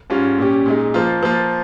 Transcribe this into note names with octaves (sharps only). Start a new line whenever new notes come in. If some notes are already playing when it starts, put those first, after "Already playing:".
G#2 G3 C#4 F4
A#2 G3 C#4 G4
A#2 G#3 D#4
F3 A#3 F4
F3 A#3 F4